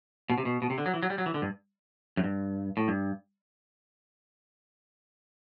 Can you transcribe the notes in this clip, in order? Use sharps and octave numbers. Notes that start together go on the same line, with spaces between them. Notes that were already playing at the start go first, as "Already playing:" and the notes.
B2
C3
B2
B2
C3
D3
F#3
E3
F#3
G3
F#3
E3
D3
G2
F#2
G2
A2
G2